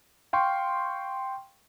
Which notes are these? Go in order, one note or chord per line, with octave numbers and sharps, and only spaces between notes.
F5 G5 C6 C#6